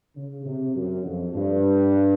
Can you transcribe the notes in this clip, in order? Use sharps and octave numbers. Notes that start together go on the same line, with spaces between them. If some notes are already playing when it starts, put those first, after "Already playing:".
C#3
C3
F#2
F2
G2